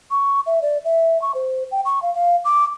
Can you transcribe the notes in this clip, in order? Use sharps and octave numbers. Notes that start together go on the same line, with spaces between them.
C#6
E5
D5
E5
C#6
C5
G5
C#6
F5
F5
D6